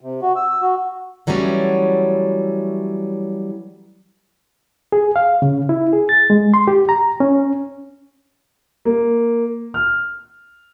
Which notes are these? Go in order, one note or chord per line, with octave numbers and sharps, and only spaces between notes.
C3
F#4
E6
F#4
E3 F#3 G3 A3 C#4
G#4
F5
C#3
E4
G#4
A6
G#3
C6
G4
A#5
C#4
A#3
F6